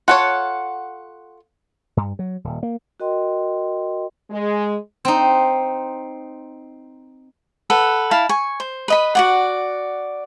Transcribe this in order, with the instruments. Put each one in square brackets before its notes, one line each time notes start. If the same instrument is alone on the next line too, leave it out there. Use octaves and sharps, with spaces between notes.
[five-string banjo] F4 A4 C#5 [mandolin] F#5
[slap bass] G2
F#3
D#1
A#3
[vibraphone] F#4 A#4 D#5 G5 C6
[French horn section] G#3
[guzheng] C4 D#4
[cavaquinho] A4 B4 F#5
E4 F5 A5 B5
G#5 C#6
C5
B4 D#5 B5
F#4 D5 F#5